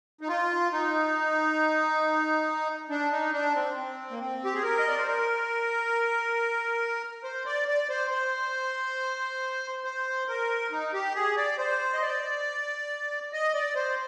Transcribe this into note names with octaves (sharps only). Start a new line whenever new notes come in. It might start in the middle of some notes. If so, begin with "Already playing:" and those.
D#4
F4
D#4
D4
D#4
D4
C4
C4
A#3
C4
G4
G#4
A#4
D#5
D5
C5
A#4
C5
D5
D5
C5
C5
C5
A#4
D#4
G4
G#4
D5
C5
D#5
D5
D#5
D5
C5